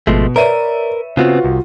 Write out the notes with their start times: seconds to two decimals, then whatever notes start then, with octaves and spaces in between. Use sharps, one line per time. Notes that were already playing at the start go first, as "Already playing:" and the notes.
0.07 G#1 B2 F3 G#3 A3
0.36 A#4 B4 C#5 D5 E5 D#7
1.17 C#3 B3 C4 F4 F#4
1.44 C2